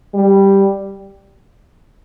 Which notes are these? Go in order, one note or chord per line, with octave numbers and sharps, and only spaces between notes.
G3